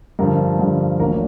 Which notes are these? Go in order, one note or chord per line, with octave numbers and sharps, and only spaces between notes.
G2 D3 F3 A#4
G2 D3 F3
A1 A2 F#3 A#3 D4 A#4